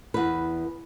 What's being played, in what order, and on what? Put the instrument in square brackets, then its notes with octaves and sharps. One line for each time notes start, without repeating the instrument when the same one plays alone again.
[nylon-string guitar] E2 B4